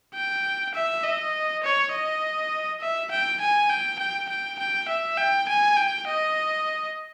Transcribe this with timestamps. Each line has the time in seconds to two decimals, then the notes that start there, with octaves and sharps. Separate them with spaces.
0.15 G5
0.74 E5
1.04 D#5
1.63 C#5
1.92 D#5
2.81 E5
3.11 G5
3.41 G#5
3.70 G5
3.99 G5
4.29 G5
4.59 G5
4.88 E5
5.18 G5
5.48 G#5
5.77 G5
6.07 D#5